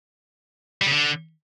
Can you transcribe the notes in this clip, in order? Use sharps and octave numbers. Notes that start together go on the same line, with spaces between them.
G3
C#3
D3